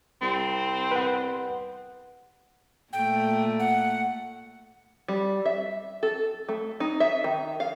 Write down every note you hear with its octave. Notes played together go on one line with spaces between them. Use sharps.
C2 C4
B4 F#5
A#2 A3 G5
F#5
G3
E5
A4
A3
D#4
E5
D#3
F5